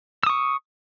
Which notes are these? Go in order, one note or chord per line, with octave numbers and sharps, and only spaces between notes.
C#6 D#6 E6